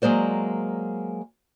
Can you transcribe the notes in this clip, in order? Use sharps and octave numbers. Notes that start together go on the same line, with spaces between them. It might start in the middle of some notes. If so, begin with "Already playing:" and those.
F#3 G#3 A#3 C5 D5